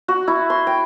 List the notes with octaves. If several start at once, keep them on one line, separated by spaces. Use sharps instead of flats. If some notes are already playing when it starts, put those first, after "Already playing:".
F#4
E4
C6
G5